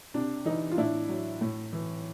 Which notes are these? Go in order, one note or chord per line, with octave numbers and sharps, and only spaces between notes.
C3 D4
E3 D#4
F4
A2 D4 E4
F#3
A2
E3